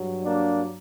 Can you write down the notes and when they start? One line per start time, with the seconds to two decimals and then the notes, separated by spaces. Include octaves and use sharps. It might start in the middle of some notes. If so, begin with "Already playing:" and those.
Already playing: G2 F#3
0.25 A#3 D4